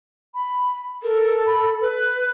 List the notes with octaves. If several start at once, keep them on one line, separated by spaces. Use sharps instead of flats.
B5
A4 A#4
B5
B4